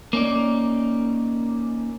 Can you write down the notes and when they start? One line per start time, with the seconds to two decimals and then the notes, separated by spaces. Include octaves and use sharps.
0.13 A#3 C#4 D#4 D5